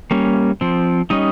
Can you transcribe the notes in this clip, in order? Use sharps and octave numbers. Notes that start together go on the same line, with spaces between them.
G3 A#3 C#4
F3 C4
G3 C#4 D#4 D#5